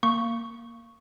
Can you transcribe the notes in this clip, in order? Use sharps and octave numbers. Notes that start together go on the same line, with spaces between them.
A#3 C#6